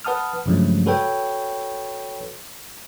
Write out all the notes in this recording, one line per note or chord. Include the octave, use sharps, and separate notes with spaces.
B4 F#5 A5 D#6 F6
G2 C#3 F3 F#3 G#3 A3
F#4 A4 B4 C#5 G5